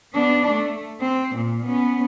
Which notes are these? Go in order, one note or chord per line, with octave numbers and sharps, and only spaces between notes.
B3 D4
A3
C4
A#2
B3 C#4